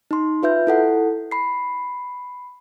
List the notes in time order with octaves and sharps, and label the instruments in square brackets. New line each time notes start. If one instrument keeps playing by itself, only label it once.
[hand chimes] D#4 C6
F4 B4 E5 G6
E4 A4 F#5
B5 C7